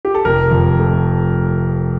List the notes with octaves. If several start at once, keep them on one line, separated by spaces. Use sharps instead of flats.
G4
A4
F1 A#4
F2
A3